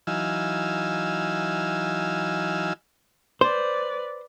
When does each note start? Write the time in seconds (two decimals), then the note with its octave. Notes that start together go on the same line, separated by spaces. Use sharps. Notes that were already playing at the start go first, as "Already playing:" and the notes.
0.07 E3 F#3 D#4 F5 G#5 E6
3.41 B4 C5 D5